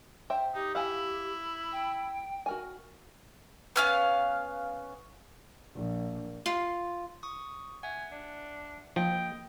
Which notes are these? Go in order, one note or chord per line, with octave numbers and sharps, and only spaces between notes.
C5 E5 G5
D#4 G4
E4 F5 F#5 G#5
G5
F#4 A#4 G#5
B3 C#4 F5
A#1
F4
C#6 D#6
E5 F#5 G#5
D4
F3 A#3 D#5 G5 D#6